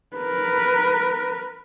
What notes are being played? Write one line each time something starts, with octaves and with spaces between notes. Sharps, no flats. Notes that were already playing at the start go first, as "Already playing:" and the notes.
A#4 B4